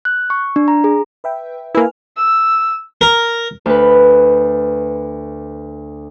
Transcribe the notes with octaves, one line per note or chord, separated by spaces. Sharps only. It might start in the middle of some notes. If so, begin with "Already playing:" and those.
F#6
C#6
D4
A#5
G#4
B4 E5 G5
A#3 E4 B4 G#5 F6
E6
A#4
D2 B4